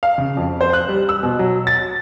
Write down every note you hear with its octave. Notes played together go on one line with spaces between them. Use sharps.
F5
C#3
F2
C5
F#6
G3
E6
B2
F#3
A6